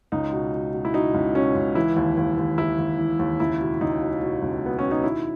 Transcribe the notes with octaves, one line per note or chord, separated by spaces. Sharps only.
C#2 D#4
B2
B2
B2
E4
B2 D#4
C#2
B2 C#4
C#2
E3 E4
D#2
D#2
D#2
D#2 E4
D#2
E3
D#2
C#2 E4
B2
C#2 D#4
B2
B2
C#2
B2 B3
B2 C#4
D#4
D#3 E4